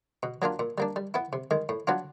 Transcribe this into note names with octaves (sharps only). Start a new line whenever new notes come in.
B2
F#3 A#3 D4 F4
A#2
G3 A#3 D4
G3
B3 E4
C3
D#3 G#3
A2
F#3 B3 D4 F4